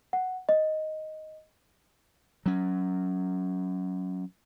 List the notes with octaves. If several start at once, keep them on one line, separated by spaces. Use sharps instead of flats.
F#5
D#5
F#3 C#4